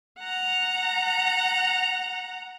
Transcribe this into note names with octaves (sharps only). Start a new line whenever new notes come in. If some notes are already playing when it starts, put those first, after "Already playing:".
F#5 A#5